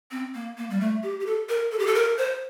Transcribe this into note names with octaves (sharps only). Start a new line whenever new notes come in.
C4
A#3
A#3
G3
A3
G4
G4
A4
A#4
A4
G4
A4
A#4
C5